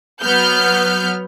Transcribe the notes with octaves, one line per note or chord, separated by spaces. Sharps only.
F#3 B3 F6 G6